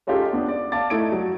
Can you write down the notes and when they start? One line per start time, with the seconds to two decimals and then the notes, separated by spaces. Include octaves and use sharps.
0.07 G#3 C#4 D#4 F4 G4 A4
0.33 B3 D4
0.48 D5
0.72 D5 F5 A5 D6 A6
0.90 A3 D#4 E4 G#6 D7
1.12 F#3